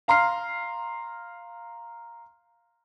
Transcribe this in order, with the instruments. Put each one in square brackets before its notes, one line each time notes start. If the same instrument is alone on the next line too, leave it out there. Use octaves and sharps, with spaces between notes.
[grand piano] F5 A#5 C6 F6 C7